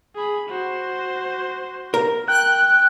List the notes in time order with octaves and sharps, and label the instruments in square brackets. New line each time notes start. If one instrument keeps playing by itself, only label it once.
[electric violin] G#4 B5
F#4 C5
[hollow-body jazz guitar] A#4
[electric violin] G5 [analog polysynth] F#6